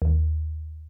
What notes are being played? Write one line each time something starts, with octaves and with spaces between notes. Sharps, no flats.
D#2